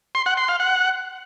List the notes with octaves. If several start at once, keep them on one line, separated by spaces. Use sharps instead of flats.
C6
F#5
C6
F5
F#5